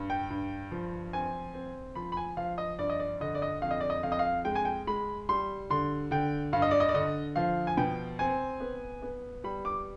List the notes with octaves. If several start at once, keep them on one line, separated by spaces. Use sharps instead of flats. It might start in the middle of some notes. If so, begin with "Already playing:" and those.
Already playing: G2
G5
G2
F3
C4 G#5
C4
F3 B5
B5
G#5
F3 F5
D#5
G2 D5
D#5
D5
D3 D#5
D5
D#5
F2 F5
D#5
D5
D#5
F2 F5
D#5
F5
G#3 G5
G#5
G5
G#3 B5
G3 C6
D3 C6
D3 G5
G2 F5
D#5
D5
D#5
D5
D3 D#5
F3 F5
G#5
B2 G5
C4 G#5
B3
B3
G3 B5
D6